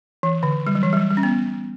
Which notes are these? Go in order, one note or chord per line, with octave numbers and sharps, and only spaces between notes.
E3
D3
G3
F#3
E3
G3
F#3
G3
C#4
B3